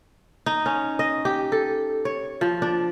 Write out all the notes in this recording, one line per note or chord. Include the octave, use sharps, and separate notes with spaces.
D#4
C#4
D#5
G4
A4
C#5
F3
D4